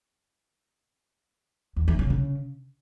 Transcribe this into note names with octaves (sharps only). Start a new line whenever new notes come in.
E2
E3
C#3
C#3